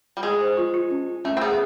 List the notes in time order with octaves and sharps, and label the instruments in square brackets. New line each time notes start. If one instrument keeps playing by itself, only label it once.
[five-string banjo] G3
[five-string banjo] G#3 [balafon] G#4
[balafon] C5
F4
F4
C#4
F4
[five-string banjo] A3 [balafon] C#4
[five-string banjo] C4
[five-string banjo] B3 [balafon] G#4